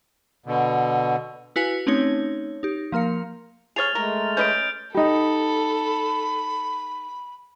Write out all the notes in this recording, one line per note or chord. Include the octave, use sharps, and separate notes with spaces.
B2 D3
E4 F#4 B4 F5 G#5 B6
A3 C4 C#4 D#4 C#5
D#4 G4
F3 A#3 A#4 F5 C#7
G#4 C#5 F6 A6 F7
G#3 A3 A#4
C#4 B4 D#5 G6 D7
D#4 G4 A4 B5